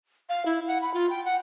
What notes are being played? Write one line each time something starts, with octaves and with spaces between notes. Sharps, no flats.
F5
E4
F#5
B5
F4
G5
F#5